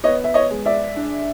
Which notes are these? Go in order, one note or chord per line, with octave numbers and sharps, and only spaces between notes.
B3 C#5 D#5
E5
C#5 D#5
G#3
D5 E5
D4